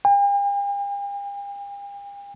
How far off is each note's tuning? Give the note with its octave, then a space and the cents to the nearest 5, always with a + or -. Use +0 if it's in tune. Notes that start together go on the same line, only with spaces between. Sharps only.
G5 +45